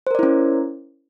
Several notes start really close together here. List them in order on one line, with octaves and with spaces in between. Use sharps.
C5 A#4 D5 E4 C#4